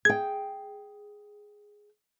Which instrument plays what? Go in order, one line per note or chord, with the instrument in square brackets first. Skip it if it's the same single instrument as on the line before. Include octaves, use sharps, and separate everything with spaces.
[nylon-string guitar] G#4 G5 [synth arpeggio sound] G#6